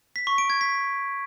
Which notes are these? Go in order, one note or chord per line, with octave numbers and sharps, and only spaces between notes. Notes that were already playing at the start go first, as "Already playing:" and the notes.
B6
C#6
D7
G#6
B6